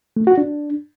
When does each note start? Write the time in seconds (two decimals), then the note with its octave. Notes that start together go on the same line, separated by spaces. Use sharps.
0.16 A3
0.27 F#4
0.38 D4